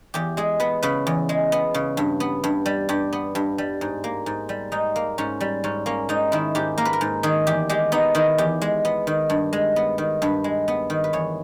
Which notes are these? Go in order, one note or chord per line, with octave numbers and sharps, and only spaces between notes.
E2 G4
G#3 G#4
B3 B4
C#3 B4
E2
G#3
B3
C#3
G2
B3
G2
G3
G2 G4
B3
G2
G3
G#2
A#3
G#2
G3
G#2 D#4
A#3
G#2 C#4
G3
G#2 C#4
A#3 C#4
G#2 D#4
D#3 E4
G#2 G4
A#3 A#4
B4
A#4
G#2
D#3 G#4
E2 G4
G#3 G4
B3 D#4
D#3 E4
E2 G4
G#3
B3
D#3
G2
G#3
B3
D#3
G2 B4
G#3
B3
D#3
B4
E2 C#5